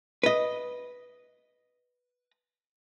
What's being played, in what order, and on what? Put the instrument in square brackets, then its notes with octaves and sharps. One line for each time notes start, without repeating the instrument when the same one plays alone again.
[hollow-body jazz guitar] B4 D#5